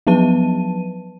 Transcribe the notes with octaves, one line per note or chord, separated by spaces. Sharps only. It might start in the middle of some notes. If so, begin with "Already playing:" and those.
F3 F#3 B3 B4 A5 D#7